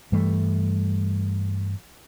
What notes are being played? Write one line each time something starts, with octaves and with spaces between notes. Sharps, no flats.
G2 E3 G3 A3